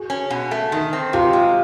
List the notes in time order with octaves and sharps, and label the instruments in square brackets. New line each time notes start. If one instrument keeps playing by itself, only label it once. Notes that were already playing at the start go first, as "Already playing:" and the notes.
Already playing: [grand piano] F#4 G#4
[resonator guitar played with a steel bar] C#4
B2
A3
D#3
C4
[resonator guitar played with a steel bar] C3 [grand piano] F4 G4
[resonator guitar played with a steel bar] G#3